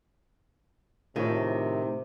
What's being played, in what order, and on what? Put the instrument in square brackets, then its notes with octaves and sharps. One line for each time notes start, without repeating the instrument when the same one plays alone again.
[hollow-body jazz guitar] A2 [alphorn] C3 [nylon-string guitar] D#3 [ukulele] F4 G#4 C#5